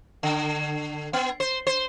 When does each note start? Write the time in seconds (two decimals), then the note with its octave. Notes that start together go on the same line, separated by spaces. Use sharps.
0.23 D3
1.13 B3
1.40 C5
1.67 C5